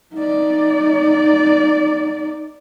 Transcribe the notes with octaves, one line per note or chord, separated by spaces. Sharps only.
D#4 D5